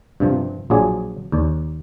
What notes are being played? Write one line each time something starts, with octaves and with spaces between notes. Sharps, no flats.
G2 C3 F3
A#1 F3 F#3 G#4 D5 G#5
D#2 D5